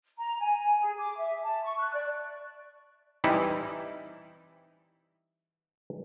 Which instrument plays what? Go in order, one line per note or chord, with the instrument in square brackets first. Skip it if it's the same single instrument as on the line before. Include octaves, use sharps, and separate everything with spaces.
[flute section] A#5
G#5
G#5
G#4
D6
E5
A5
C#6
F#6
D5
[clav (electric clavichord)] E3 G3 C4 D#4 E4